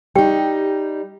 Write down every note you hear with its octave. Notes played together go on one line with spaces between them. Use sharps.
G3 D#4 G4 G5